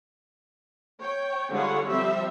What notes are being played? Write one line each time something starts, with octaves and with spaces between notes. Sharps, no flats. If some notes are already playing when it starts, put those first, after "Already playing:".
C#5 G5
D3 G3 G#3 F4 C#5 F#5
F3 G3 C4 G4 E5